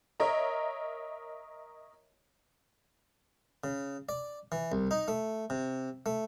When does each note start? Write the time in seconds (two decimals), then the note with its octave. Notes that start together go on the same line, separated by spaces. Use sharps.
0.20 A#4 C#5 D#5 E5 A#5
3.64 C#3
4.09 D5
4.52 E3
4.72 C2
4.91 D#4
5.08 A3
5.50 C3
6.06 A3